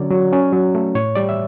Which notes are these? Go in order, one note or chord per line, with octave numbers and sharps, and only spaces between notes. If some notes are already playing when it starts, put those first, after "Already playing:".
Already playing: D3 F#3 C#4 D5
F#3
C#4
F#3
A3
A2 C#5
G3 D5
E5